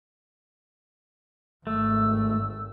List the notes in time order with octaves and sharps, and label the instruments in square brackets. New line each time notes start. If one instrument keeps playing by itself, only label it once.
[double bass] G#1 [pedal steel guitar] A3 [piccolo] E6